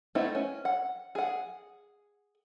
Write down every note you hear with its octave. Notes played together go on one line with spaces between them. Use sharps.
A3 B3 C4 D#4 E4
C#4
F#5
G#4 F#5